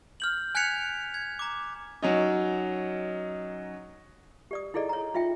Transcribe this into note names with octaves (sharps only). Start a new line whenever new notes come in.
F6 G6 F#7
G#5 F#6 G#6 B6 C#7 F7
G#6
A#5 D6
F#3 C#4 D#4
G4 D5 D#6
D#4 E4 G#4 A4 D5 D#5
C#5 A#5
D#4 F4 E5 G5